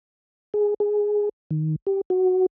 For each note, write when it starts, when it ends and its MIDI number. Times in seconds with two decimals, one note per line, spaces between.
0.54 0.74 68
0.80 1.29 68
1.51 1.76 51
1.87 2.01 67
2.10 2.46 66